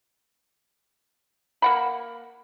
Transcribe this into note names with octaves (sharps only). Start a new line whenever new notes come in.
A#3 F#5 B5